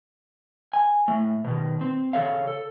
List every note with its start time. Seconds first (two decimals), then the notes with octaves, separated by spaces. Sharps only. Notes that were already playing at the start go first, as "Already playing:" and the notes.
0.73 G#5
1.08 A2 A3
1.44 B2 D#3
1.81 C4
2.13 C#3 G3 A4 C#5 F5
2.47 A4